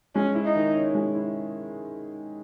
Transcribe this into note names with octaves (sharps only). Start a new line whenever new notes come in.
G#3 C#4
E4
D#4
D#3
C#4
G#3
E4